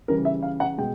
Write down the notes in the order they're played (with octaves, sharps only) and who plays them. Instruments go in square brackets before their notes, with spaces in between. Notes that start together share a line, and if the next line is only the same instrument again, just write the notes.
[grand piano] C#3 E3 G3 A#4
E5
F5
F#5
B2 G#3 G5